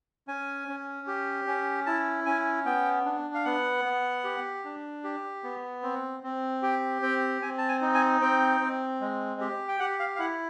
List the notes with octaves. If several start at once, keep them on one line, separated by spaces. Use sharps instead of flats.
C#4 G#5
C#4
G4
C#4
E4 A5
C#4 G#5
B3 G5
D4
F5
B3 F#5
B3
G4
D4
G4
B3
C4
C4
G4 G5
C4 G5
C4 G#5
A5
G#5
D#4
G#5
C4 G5
C4
G#3
G4
G5
G4 F#5
F5
F5
E4 F#5